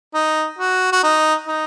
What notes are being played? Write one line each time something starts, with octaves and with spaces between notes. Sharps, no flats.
D#4
F#4
F#4
D#4
D#4